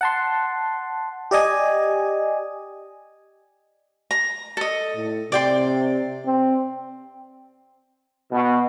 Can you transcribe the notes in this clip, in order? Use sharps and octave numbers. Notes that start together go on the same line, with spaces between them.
F#5 A5 C6
G4 D5 D#5 G#5
A#5
A4 D#5
A2
C3 D5 G5 C6
C4
B2